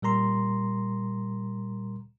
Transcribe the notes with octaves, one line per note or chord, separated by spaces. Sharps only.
A#2 G3 A#4 A#5 C6